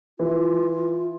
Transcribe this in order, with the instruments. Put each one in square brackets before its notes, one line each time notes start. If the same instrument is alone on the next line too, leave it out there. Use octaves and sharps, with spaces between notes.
[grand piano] E3 [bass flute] F4